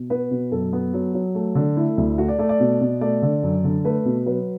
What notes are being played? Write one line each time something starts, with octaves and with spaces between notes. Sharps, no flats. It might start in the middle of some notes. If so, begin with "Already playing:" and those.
Already playing: B2
B3 B4
B2
F#2 A4
B3
F#3
F#3
A3
D3
A3 E4
D2
A3 F#4
D5
A3 D5
D5
B2
B2
A3 D5
D3
F#2
D3
A3 B4
B2
F#3 B4